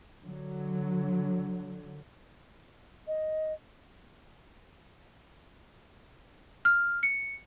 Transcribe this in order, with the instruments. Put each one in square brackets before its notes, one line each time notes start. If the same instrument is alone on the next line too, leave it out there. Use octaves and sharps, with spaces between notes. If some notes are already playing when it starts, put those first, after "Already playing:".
[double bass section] D3 F#3
[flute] D#5
[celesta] F6
C#7